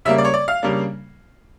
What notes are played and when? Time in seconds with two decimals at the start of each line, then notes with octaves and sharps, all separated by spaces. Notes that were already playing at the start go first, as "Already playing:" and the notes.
0.05 C#3 G3 A#3 E5
0.18 D5
0.25 C#5
0.34 D5
0.48 F5
0.62 C#3 G3 A#3 D4